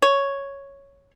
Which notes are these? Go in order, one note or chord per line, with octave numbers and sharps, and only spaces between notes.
C#5